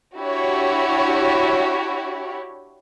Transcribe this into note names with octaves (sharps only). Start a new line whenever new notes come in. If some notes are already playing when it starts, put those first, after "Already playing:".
D4 E4 F#4 G4 C#5